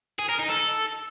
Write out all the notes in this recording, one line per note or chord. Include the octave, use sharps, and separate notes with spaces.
G#4
A#4
D#4
A4